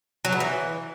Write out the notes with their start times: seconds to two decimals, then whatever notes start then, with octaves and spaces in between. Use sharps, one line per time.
0.25 F#3
0.32 B2
0.40 E3